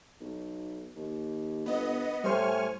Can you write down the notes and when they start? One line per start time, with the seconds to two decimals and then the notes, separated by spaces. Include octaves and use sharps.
0.20 B1
0.96 D#2
1.66 G1 B3 D#5
2.24 A2 G3 C5 G#5 C#6 F6